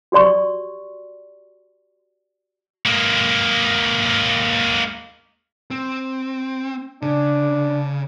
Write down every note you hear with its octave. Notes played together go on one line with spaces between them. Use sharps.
F#4 G4 D5 C6 C#6
G#3 A#3
C4
C#3 D4